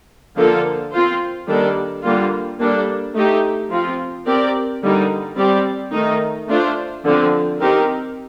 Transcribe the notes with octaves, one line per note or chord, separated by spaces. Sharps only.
D3 F3 A#3 F4 A4
C4 F4 C5
D#3 G3 A#3 D4 A4
D3 G3 A#3 F4
G3 A#3 D4 A4
A3 D#4 G4
F3 C4 F4
C4 G4 A#4 D5
D3 G3 A#3 D#4
G3 C4 G4 D5
D#3 A3 D#4
A3 D4 F4 C5
D3 F3 C4
C4 D#4 G4 A#4